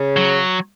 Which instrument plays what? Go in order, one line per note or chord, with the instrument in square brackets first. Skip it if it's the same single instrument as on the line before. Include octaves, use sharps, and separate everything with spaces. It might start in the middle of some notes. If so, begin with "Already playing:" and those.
Already playing: [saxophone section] C#3
[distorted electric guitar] F#3